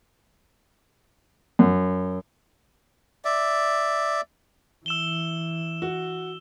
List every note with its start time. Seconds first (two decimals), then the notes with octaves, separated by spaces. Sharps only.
1.59 F#2
3.25 D5 E5
4.86 E3 E6 E7 G7
5.82 F#4